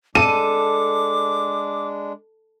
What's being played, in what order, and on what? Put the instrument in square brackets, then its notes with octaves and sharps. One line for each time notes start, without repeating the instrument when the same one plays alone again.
[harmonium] G#3 D4 [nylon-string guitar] A4 [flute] D6 [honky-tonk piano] D#7